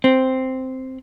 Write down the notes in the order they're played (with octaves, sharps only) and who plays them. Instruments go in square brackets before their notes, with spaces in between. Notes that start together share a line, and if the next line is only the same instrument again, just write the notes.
[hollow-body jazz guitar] C4